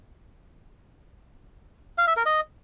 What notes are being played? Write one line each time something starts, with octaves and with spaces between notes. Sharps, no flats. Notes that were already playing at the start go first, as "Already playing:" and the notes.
F5
E5
A#4
D#5